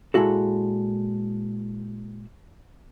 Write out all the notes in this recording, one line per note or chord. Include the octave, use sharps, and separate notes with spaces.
A#2 G3 G#3 E4 F#4 A4